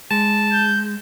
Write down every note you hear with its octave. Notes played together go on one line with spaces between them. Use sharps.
G#3 A5
G6